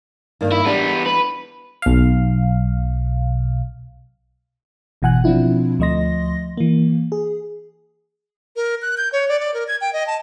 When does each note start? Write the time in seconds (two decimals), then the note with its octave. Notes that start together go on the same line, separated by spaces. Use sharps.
0.41 G2 D#3 A#3
0.52 E4
0.65 E3 G3 G#3 B3 D4
1.06 B4
1.82 B1 F5
5.02 G#1 B2 E3 F#5 G#5 F#6
5.24 B2 F3 C4 D4 E4 F4
5.79 D2 F3 A3 D#5 C6 A#6
6.57 E3 A#3
7.12 G#4
8.56 A#4
8.82 F#6
8.98 G6
9.13 C#5
9.29 D5
9.40 D5
9.54 A#4
9.68 G#6
9.81 G5
9.93 D#5
10.07 A5